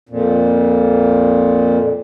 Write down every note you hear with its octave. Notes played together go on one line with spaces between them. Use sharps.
F2 A#2